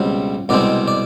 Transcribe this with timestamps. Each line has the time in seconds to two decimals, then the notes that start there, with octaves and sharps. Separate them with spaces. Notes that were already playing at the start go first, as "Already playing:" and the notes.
Already playing: C#2 B2 G3 C4
0.49 C2 B2 G#3 C4 D5
0.88 D5